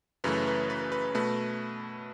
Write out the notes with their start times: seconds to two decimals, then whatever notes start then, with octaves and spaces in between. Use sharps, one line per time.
0.24 F#2 C#3 E3 A3 B4
0.47 B4
0.70 B4
0.92 B4
1.14 B2 A3 B4